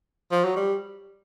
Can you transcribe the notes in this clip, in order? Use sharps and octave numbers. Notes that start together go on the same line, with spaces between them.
F3
F#3
G3